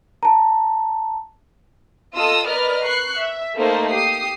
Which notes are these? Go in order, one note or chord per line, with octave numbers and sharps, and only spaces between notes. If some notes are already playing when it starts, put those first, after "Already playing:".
A5 A#5
F4 A4 D#5 D#6 E6
A#4 B4 D5 D#5 F6
C#6 F#6 C7
E5
A3 A#3 D#4 A#4 C5 A5
G4 D#6 C7